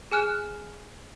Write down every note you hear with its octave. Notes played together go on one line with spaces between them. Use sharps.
G#4 G#5 F6 F#6 E7